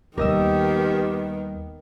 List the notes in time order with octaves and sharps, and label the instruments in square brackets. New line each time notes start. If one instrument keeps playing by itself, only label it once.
[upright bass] D#2 G3 [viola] D#3 B3 [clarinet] G4 [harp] A#4 D#5 E6